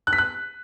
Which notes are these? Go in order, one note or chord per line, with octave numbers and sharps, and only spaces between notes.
F#6
B6
F#6